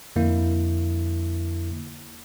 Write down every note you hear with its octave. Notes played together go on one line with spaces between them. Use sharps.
F2 D3 A#3 E4